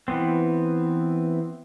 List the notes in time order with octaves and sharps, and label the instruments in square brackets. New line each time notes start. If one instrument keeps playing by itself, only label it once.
[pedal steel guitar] E3 B3 C4